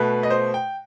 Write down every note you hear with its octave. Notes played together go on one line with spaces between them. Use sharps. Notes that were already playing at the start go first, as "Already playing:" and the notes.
Already playing: B2 A3 B4
D#5
C5
G5